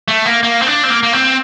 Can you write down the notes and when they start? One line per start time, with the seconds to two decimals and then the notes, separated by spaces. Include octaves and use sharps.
0.08 A3
0.25 A#3
0.43 A#3
0.62 C4
0.67 D4
0.83 C4
0.90 A#3
1.03 A#3
1.13 C4